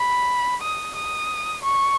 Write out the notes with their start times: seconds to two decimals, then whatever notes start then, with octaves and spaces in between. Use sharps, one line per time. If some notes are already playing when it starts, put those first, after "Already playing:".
Already playing: B5
0.62 D#6
0.96 D#6
1.64 C#6